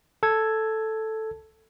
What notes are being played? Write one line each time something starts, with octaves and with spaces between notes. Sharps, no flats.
A4 G#6